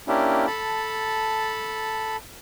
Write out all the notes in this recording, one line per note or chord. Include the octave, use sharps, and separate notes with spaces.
A#3 C#4 D4 E4 G4
A4 A5 B5